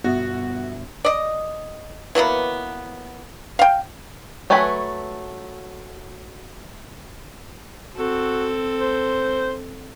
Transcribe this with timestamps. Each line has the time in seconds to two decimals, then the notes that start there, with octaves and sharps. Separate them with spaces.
0.04 G1 B2 B3 F#4 E5
1.05 D5 D#5
2.15 E3 F#3 A#3 B3
3.59 F5 G5
4.50 F#3 A3 B4 G#5 B5
7.96 C4 F#4 A4
8.79 C5